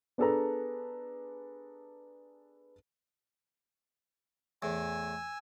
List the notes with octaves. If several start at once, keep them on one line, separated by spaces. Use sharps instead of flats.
B3 D4 G#4 A4 B4 A#5
E2 A2 G#5 E6